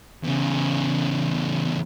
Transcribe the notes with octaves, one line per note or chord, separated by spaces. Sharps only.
E2 C#3